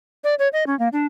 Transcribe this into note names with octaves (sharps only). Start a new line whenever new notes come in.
D5
C#5
D#5
C#4
A#3
D4